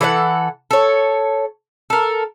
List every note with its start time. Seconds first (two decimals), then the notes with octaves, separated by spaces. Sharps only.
0.01 E3 A4 D#5 F#5
0.71 A4 C#5
1.90 A4 A#4